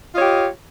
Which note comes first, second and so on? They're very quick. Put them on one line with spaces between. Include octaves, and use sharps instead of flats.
F4 D#5 C#5 G4